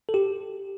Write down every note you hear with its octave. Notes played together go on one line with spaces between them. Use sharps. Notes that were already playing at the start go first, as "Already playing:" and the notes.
A4
G4